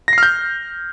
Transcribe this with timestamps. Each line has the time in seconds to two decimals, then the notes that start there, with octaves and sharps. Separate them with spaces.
0.08 A#6
0.13 C7
0.18 F6
0.23 G6